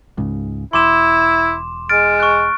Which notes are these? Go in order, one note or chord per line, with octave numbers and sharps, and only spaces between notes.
C#2 G#2 C#3
E1 E4 C6 D6 E7
G#3 F6 A6 D7
C#6 F#6